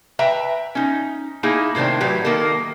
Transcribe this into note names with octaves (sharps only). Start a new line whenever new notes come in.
B4 E5 G5 A#5
C#4 D#4
A#3 D#4 E4 G#4
A2 C3 D#3 C4 D4
A2 F#3 G4 B4
D#3 A#3 A4 A#4